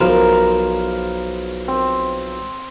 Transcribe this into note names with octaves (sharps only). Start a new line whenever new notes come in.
B1 F3 A#4
C4